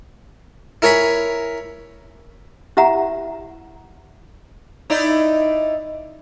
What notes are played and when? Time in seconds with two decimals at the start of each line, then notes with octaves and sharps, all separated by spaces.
0.82 E4 A#4 C#5 G#5 B5
2.77 E4 G4 E5 F#5 A#5
4.90 D#4 E4 D5